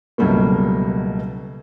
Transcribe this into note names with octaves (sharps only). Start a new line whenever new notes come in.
C#2 B2 F#3 G3 A3 A#3